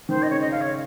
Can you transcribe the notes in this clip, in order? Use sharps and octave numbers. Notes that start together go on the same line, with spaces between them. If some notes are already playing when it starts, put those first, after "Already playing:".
D#3 C5
D#5
C#3 C#5
D#5
F5
C#5